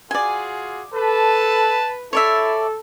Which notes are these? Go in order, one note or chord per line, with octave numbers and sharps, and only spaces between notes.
F4 F#4 G#4 D5 G#5
A4 B4 A5
E4 A4 C#5 D5 E5